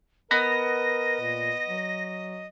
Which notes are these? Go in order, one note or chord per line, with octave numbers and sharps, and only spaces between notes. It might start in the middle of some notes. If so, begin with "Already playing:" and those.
B3 A#4 D#5 A#6
A#2
F#3